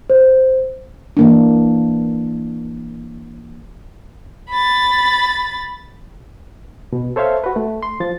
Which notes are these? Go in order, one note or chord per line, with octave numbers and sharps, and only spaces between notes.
C5
E3 A#3 D4
B5 A6
B2
A4 C5 C#5 E5 F5
F#4 B4
A3
C6
F3 A6